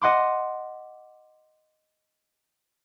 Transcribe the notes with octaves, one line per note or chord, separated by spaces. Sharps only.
D#5 F#5 C6 D6